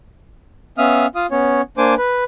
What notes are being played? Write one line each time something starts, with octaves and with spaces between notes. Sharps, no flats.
B3 C#4 E5 F5 D#6 F6
F4 F5 D#6
B3 C#4 C#5
A#3 D4 C5 G#5 D6
B4